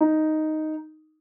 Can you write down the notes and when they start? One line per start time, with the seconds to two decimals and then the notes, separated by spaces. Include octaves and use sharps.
0.01 D#4